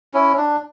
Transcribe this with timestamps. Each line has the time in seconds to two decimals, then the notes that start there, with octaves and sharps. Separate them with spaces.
0.14 C#4 E4
0.37 D4